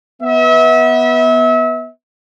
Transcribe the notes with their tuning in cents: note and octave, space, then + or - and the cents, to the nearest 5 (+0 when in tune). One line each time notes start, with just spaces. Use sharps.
B3 -10 E5 -35